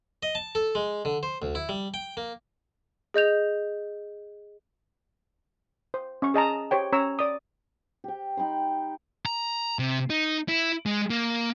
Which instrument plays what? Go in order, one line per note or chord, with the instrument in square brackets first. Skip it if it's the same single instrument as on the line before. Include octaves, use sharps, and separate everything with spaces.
[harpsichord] D#5
A5
A4
G#3
D3
C5
D2
E4
G3
G5
A#3
[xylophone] G#4 D#5 G6 F7
[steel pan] C5
C#4 C#6
G#4 D#5 A5 A#5
G4 C5 C#5 G5
C#4 C#5 A#5 E6
D5 D#6
[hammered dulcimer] G4 G5
D#4 G5 B5 C6
[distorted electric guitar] A#5
C3
D#4
E4
G#3
A#3